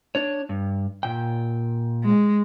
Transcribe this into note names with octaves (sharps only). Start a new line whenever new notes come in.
D4 C#5
G2
A#2 G5
G#3